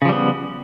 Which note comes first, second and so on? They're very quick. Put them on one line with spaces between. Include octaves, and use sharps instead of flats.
C#3 F3 G3 B3